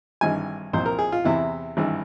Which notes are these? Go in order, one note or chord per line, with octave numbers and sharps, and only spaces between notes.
G#1 G2 E3 G#5
C2 A#2 F3 C5
A#4
G#4
F4
E2 C3 E3 E4
G#1 G2 E3